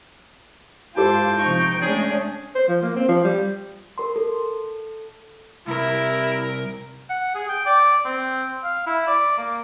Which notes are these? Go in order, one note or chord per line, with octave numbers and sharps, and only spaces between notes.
G#2 E4 F4 G4 A4 C5 G5 A5
C3 F3 D#4 C#6
G#3 A3 C#4 D4 G#4 G5
C5
F3
A#3
C4
F3
G3
A#4 C6
A4
C2 E4 A#4
F#5
G#4
G5
D5
C4
F5
E4
D5
A#3